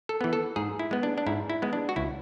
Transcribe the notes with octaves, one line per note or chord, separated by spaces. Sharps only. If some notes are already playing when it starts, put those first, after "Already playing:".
A4
E3 B3
A4
G#2 G#4
E4
G#3 B3
D4
D4
G#2 E4
E4
G#3 B3
D4
F#4
C#2 E4